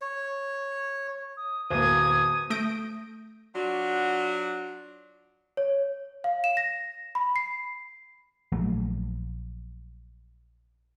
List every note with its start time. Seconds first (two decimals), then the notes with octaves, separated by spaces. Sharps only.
0.01 C#5
1.37 D#6
1.70 D1 A#3 B3 C5 D#6 G#6
2.50 A3 D#6 G6 A#6 D7
3.55 F#3 D4 F4 F#4
5.57 C#5
6.24 F5
6.44 E7
6.57 A#6
7.15 B5
7.36 C7
8.52 A#1 F#3 A3